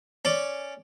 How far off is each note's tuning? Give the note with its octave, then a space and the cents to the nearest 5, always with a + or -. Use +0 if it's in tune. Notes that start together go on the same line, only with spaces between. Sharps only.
C#4 +0 D5 +0